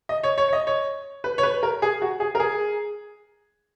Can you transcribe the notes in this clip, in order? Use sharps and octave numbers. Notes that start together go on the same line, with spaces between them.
D#5
C#5
C#5
C#5
D#5
C#5
B4
C#5
B4
A#4
G#4
F#4
G#4
A#4
G#4